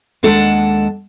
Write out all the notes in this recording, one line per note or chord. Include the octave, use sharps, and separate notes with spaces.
D#2 G#3 D4 A4 F#5